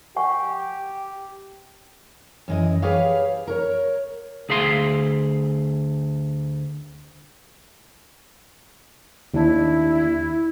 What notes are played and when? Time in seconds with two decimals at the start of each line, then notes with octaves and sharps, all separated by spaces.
0.16 G4 F#5 G#5 C#6
2.48 F#2 E3 D#5
2.82 G4 G#4 B4 C#5 F5
3.47 A#4 C#5
4.49 D2 G#4 E5 F5 C6
9.34 D#2 D4 E4